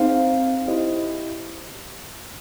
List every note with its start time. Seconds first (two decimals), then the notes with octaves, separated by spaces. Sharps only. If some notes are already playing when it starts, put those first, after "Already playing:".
Already playing: C4 D#4 G#4 C5 F5
0.68 E4 G4 C5 D#5